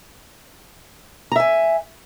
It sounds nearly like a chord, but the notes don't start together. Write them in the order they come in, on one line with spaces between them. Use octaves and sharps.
A#5 E5 G#5